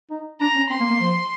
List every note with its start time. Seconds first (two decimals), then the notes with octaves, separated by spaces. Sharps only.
0.11 D#4
0.40 D4 A#5
0.55 C#4
0.69 C4 C6
0.80 A#3
0.90 A#3
1.00 F3